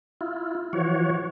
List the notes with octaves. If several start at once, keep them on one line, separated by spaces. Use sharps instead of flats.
E4 F4
E3 F3 F#4 C#5